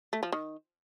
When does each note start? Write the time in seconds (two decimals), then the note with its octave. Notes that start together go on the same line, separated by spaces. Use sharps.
0.13 A3
0.23 F3
0.32 D#3